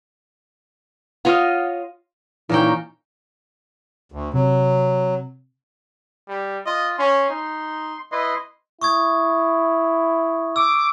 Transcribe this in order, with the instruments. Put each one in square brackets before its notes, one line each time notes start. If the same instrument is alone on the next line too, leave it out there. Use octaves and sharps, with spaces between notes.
[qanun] F4 C#5 D#5 [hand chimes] F#5 F6
[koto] A#2 D#4 G5 [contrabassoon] E3 [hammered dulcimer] A#3 C#4
[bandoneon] D2
[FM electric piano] C3 [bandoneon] F#3
[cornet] G3
[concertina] F4 [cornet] D#5
[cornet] C#4 [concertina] C6
[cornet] D#4
[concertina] E4 B4 C6 [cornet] D#5
[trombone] E4 [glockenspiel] C#6 D#6 G#6
[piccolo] D6 [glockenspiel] E6